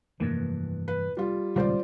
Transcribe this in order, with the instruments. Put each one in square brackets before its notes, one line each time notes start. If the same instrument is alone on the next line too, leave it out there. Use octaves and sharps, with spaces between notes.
[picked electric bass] F1 A#3 [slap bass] G2 E3
[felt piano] B4
G3 F4
[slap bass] D#1 C#2 [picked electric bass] G3 [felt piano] F4 C5 D5